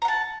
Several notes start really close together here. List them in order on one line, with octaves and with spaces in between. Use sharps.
A#5 F#5 A5